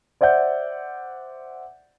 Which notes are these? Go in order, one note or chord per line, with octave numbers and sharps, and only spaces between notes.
C5 D5 E5 F#5 G6